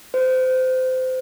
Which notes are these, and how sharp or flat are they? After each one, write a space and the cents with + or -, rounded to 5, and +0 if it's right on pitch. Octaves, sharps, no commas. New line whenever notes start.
C5 -25